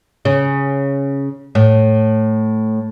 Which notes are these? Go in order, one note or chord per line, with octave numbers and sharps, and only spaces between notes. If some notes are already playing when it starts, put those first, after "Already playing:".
C#3
A2